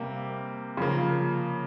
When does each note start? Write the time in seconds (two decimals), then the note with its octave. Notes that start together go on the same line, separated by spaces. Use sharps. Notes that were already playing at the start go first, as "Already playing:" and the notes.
Already playing: C3 G3 A#3
0.77 C#3 F3 A#3